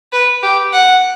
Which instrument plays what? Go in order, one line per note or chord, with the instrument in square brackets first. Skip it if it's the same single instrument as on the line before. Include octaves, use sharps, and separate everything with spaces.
[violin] B4
G4
F#5